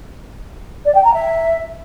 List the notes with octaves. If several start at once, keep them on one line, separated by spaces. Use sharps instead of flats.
D5
G5
A#5
E5